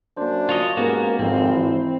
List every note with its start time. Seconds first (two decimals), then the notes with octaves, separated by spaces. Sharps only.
0.17 F#2 A#3 D4 C5
0.49 F4 C#5 D#5
0.77 G#2 G#3 A#3 B3 C#4 F#4 G4 A#4
1.19 G#1 F2 G#2 F3 C4 F5
1.54 E3 E4